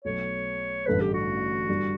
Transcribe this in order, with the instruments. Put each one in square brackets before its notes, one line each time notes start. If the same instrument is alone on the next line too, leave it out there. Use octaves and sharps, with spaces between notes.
[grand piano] B1 B2 A3 [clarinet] C#5
[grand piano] A1 G2 D3 A3 [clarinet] B4
[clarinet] G4
F#4
[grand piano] G2 D3 G3 D4